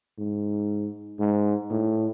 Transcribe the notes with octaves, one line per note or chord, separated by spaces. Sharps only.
G#2
G#2
A2